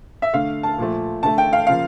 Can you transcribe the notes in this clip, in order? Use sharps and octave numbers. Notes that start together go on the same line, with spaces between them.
E5
D3 A3 F5
A5
A#2 F3 A3
D3 A3 A5
G5
F5
C#3 F3 A#3 F5